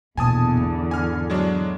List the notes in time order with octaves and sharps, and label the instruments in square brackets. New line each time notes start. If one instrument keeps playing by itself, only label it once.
[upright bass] A#1 B2 [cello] E2 D3 [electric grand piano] G#5 A5 D#6
[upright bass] G#2
[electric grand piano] G#5 F6
F#3 G#3 D4